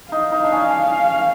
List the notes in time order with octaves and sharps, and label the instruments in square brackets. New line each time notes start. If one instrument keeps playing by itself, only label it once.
[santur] D#4 [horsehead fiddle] F5
[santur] D#4
D4
C#4